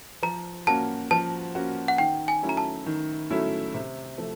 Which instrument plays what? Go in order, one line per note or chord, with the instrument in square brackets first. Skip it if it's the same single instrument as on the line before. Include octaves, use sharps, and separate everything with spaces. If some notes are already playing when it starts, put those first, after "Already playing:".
[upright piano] F3 [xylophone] A#5
[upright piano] A#3 C#4 F#4 [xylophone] A5
[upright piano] F3 [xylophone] A5
[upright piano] A#3 C#4 F#4
[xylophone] F#5
[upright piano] D#3 [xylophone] G5
[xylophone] G#5
[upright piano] F#3 A3 C#4 E4
[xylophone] A#5
A5
[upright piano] D#3
F#3 A3 C#4 E4
C3
F3 A3